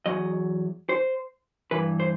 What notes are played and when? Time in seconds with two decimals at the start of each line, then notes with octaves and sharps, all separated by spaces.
0.06 E2 B2 F#3 D#5
0.89 C5
1.71 G2 E3 B4
2.00 C5